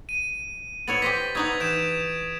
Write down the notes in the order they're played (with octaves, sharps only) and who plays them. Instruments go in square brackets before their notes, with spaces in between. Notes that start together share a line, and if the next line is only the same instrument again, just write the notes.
[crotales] D#7
[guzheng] B3 E4 C#5 [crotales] A6 F#7
[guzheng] G4 C5 D#5 [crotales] B6
[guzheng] B3 D#4 E4 [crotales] C#6 D#6 G#6
[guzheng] E3 [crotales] G6 D7 E7